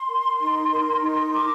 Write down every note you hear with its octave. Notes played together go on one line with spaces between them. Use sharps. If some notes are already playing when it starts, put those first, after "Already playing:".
Already playing: C6
A#4
D#4
A#4
D#4
A#4 D6